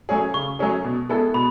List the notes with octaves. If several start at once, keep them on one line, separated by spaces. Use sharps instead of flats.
F#3 A3 C#4 G#4
C#3 C#6
F#3 A3 C#4 G#4
B2
G#3 B3 E4 A4
B2 B5